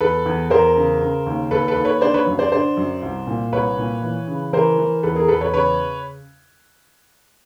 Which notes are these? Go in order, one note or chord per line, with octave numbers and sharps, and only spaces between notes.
E2 A4 B4
E2
E2 A#4 C5
C#3
C#3
D#2
D#2 A4 B4
A4 B4
D#2
B4 C#5
D3 C5 D5
B4 C#5
F#2
C5 D5
D3 C5 D5
F#2
C2
A#2
C2 B4 C#5
A#2
E3
C#3
E3 A#4 C5
E3
E2 A4 B4
G#4 A#4
E2 A4 B4
B4 C#5
C#3 B4 C#5